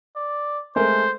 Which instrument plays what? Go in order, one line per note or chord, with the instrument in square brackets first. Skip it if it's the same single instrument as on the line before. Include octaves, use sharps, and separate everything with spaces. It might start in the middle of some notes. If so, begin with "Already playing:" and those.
[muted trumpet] D5
[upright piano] G#3 A3 A#4 [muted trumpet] C5